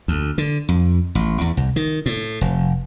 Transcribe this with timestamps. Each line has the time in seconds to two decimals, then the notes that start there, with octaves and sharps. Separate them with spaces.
0.08 D2
0.38 D3
0.69 F2
1.15 A1
1.41 E2
1.57 C2
1.76 D#3
2.06 A2
2.41 F1